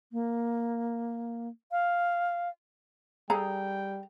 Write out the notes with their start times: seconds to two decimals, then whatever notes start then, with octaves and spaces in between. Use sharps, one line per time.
0.12 A#3
1.71 F5
3.30 G3 G#4 A4 G5 A#5